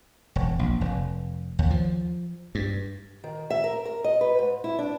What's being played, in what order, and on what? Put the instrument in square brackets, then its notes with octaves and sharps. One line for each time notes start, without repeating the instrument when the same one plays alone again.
[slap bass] E1
A#1
F1
D#2
F3
G2
[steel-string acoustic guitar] D#3
E5
A#4
A#4
D#5
B4
G#2
E4
D4